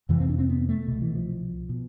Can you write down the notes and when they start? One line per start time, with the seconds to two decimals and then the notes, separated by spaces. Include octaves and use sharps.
0.09 F2 C3 E3
0.20 C4
0.29 D4
0.39 C4
0.49 B3
0.69 A3
0.88 C2 B2
1.02 E3
1.15 F3
1.69 B2